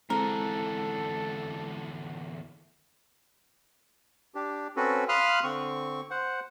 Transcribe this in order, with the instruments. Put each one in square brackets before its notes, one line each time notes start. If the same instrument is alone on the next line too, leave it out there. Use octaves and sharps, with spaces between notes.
[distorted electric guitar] E2 D3 [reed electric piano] G#3 C4 E4 [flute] A4 [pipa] A#4
[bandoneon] D4 G4
C4 C#4 F#4 A4 B4
F5 B5 C6 D#6 F6 F#6
D3 C4 C#6
C5 F#5